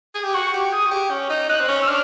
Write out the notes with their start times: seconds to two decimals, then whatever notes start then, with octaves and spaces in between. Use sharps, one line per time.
0.15 G#4
0.23 G4
0.34 F#4 C#6
0.53 G4
0.72 G#4 D#6
0.86 F#4
0.91 G4
1.11 C#4
1.30 D#4
1.49 D#4 F#6
1.60 C4
1.68 C#4
1.82 E6
1.88 D4 F6